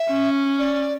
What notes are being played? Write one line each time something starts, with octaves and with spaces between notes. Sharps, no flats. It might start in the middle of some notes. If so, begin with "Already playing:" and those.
Already playing: E5
C#4
D5